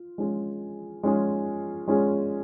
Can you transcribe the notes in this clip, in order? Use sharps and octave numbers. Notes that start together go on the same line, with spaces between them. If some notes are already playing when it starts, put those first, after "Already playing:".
Already playing: F4
G#3 C#4 F4 G#4
G#3 C#4 F4 G#4
G#3 C#4 F4 G#4